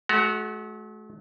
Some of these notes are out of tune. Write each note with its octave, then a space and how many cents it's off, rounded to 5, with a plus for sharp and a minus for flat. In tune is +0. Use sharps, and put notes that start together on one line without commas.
A3 -45 F#4 +0 A#5 +0